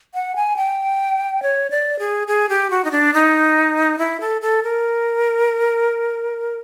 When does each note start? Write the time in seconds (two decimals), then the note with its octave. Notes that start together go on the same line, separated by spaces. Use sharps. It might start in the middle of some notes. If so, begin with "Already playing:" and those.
0.14 F#5
0.36 G#5
0.56 G5
1.42 C#5
1.70 D5
1.99 G#4
2.27 G#4
2.49 G4
2.70 F#4
2.84 D#4
2.91 D4
3.14 D#4
3.98 E4
4.20 A4
4.41 A4
4.63 A#4